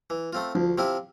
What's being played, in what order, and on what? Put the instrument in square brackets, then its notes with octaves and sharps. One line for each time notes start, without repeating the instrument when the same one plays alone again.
[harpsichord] E3
A3 C4 F4
[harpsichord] D2 [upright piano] F3
[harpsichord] C3 F3 C4 E4